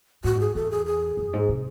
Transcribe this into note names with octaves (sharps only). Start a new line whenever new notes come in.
A2 F#4
G#2
G#4
E2 A4
G#4
G#4
F#2
G#2
C3